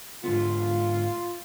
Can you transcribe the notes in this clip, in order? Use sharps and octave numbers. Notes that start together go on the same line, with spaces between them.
G#2 D3 B3 F4